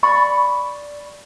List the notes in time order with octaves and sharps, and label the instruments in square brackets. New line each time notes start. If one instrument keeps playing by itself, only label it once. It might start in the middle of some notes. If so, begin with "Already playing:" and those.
[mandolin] D5 B5 C#6